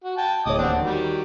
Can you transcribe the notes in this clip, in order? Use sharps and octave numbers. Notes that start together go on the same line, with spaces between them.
F#4
G5 A5
D1 C#5 D#5 D6 D#6
D#2 C4 D4 D5 F#5
D#3 F#3 G3